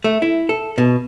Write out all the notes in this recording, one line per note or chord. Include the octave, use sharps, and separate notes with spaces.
A3
E4
A4
B2